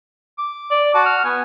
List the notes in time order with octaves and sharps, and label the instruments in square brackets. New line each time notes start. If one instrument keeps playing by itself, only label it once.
[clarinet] D6
[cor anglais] D5
[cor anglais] F#4 [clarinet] A5
[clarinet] F6
[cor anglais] B3 [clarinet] G#5